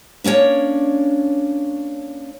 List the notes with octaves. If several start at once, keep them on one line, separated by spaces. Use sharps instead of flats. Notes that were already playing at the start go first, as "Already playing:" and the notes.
A#3 C#4 D4 C#5